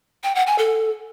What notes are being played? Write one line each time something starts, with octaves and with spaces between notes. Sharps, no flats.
G5
F#5
G#5
A4